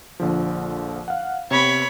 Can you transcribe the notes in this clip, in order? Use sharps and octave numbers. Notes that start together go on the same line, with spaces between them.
A#1 D3 F3
F5 F#5
C3 B3 C#5 B5